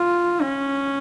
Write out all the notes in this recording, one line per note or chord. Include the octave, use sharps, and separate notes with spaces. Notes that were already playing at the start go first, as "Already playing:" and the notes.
Already playing: F4
C#4